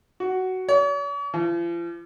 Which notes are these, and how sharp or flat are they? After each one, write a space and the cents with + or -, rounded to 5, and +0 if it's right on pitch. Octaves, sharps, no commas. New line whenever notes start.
F#4 +10
C#5 +45
F3 -40